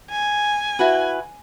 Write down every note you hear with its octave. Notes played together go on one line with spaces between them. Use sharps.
G#5
E4 F#4 B4